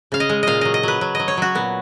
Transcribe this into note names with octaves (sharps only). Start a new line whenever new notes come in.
C#3 F5
D#5
G#3
A#2 D#5 F5
F#3 D#5
D#5
F#3 B4
F#3
F#3 D#5
C#5
F#3 F#4
A#2 B3